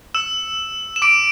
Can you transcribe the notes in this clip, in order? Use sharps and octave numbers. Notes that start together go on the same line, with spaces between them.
E6 E7
E7
D6 D7